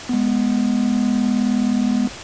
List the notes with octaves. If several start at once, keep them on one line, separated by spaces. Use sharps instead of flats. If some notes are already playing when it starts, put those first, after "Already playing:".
G#3 B3